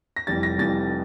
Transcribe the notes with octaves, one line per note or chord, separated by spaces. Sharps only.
A#6
F1 F2 E3 G3 A6
A#6
F1 F2 E3 G3 A6